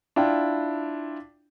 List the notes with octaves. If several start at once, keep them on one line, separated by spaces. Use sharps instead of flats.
D4 E4 F4 G5